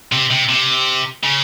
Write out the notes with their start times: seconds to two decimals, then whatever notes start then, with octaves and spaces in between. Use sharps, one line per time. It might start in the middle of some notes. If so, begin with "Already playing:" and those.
0.12 C3
0.31 C3
0.49 C3
1.23 C#3